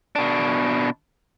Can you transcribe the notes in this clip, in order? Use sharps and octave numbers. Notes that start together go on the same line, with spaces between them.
B2 D4